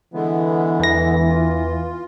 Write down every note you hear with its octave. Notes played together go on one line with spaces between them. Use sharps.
D3 E3 G#3 B3
E2 A#6
F4